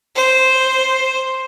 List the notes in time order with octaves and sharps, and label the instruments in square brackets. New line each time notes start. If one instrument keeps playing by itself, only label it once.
[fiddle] C5